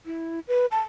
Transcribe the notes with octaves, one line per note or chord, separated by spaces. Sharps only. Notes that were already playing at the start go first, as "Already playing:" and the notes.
E4
B4
A5